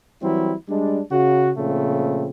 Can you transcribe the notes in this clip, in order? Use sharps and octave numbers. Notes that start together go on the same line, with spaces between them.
E3 F#3 G3 C4 E4
G3 G#3 D4
C#3 F#4
A#2 C#3 F3 A3 C4